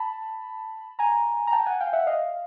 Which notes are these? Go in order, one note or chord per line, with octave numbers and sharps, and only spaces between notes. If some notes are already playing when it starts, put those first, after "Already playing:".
Already playing: A5 B5
G#5 A#5
A#5
G5 A5
F#5 G#5
F5 G5
E5 F#5
D#5 F5